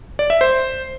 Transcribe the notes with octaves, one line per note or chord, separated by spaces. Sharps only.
D5
E5
C5